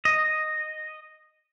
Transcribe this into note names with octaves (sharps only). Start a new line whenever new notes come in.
D#5